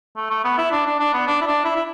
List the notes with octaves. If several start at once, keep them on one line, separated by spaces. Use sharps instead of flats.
A3
A3
B3
E4
D4
D4
D4
B3
D4
E4
D4
E4
E4